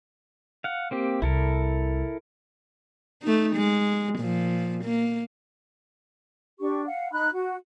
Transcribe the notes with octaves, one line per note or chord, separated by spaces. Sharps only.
F5 F#5
A#3 C4 G4
C2 E4 A4 A#4
A3 D#4
G#3
A#2 F3
A#3
D4 G4 C#6
F5 F#5
D#4 B5 F#6
F#4